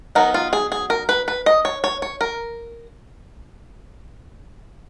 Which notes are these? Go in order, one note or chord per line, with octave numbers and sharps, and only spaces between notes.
F#3 B3 D#4 A#4
F4
G#4
G#4
A#4
B4
B4
D#5
C#5
C#5
C#5
A#4